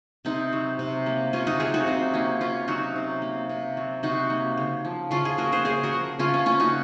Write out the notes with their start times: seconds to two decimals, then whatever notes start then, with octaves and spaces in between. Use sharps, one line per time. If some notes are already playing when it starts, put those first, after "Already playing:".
0.25 C3 C4 D#4
0.53 F#3
0.79 C3
1.06 A#3
1.33 C3 C#4 F4
1.47 D#4 F#4
1.60 F#3 F4 G#4
1.74 D#4 F#4
1.87 C3 C4 D#4
2.14 A#3 C#4
2.41 C3 C#4 F4
2.68 F#3 D#4 F#4
2.96 C3
3.22 A#3
3.49 C3
3.77 F#3
4.03 C3 D#4 F#4
4.30 A#3
4.57 C#3
4.85 F3
5.11 C#3 C#4 F4
5.25 F4 G#4
5.38 A#3 F#4 A#4
5.52 G#4 C5
5.65 C#3 G#4 C5
5.83 F#4 A#4
5.93 F3
6.19 C#3 C#4 F4
6.34 C#4
6.46 A#3 C#4 F4
6.60 D#4 F#4